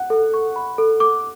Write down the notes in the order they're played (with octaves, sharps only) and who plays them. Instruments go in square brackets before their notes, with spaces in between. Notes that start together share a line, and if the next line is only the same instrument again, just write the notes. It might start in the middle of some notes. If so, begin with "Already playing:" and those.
Already playing: [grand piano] F#5
[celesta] A4
C#6
B5
A4
D6